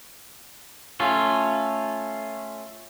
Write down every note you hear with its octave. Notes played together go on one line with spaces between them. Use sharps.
A3 C#4 F4